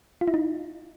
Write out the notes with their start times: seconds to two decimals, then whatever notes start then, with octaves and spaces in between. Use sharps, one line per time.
0.21 F4
0.28 E4
0.34 D#4